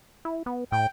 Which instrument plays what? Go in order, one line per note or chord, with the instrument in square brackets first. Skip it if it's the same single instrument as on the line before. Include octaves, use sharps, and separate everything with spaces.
[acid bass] E4
B3
[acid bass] A2 [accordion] G5